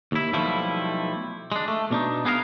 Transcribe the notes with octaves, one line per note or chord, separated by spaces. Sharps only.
D#2 E4
B1 F3 G3 A3 E4
G#3 D4
A3
B2 D4 D#4
B3 G#4 A#4 C5 F5